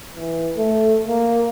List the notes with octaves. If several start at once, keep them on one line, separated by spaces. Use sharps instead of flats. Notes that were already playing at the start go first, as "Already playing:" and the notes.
E3
A3
A#3